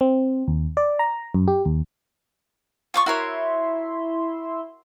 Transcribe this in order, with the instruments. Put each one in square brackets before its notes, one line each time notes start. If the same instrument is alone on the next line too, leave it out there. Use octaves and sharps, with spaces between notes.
[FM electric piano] C4
D#2
D5
A#5
F#2
G4
D#2
[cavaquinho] F4 D5 C#6
[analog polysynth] E4 E5 C6 [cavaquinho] F#4 A#4 C#5